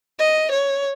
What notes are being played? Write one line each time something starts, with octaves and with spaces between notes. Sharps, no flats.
D#5
C#5